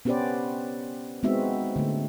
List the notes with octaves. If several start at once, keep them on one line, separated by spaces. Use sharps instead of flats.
B3 C#4 G4 B4 C5 D5
G#3 B3 C4 D#4 F#4 E5
D3 A3